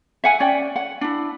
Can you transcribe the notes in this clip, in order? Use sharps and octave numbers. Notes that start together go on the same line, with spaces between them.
E5 F#5 G#5
C#4 D5 G5
F#5
D4 E4